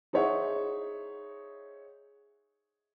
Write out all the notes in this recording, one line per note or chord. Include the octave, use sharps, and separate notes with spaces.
D#4 G#4 C5 C#5 E5 F#5